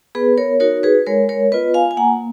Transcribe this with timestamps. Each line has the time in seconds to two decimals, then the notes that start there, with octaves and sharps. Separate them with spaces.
0.15 B3 G#4 B4
0.37 A#4 C#5
0.60 D#4 F#4 A#4 C#5
0.83 G#4 B4
1.06 G#3 A#4 C#5
1.29 A#4 C#5
1.52 B3 F4 B4 D#5
1.74 F5 G#5
1.91 G#5
1.97 A#3 F#5 A#5